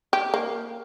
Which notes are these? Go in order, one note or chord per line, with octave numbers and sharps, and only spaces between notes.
G4
A#3